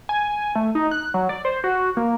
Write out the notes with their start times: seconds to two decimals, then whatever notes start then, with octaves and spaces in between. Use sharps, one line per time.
0.09 G#5
0.55 A3
0.75 D#4
0.91 F#6
1.14 F#3
1.29 D5
1.45 C5
1.64 F#4
1.97 A#3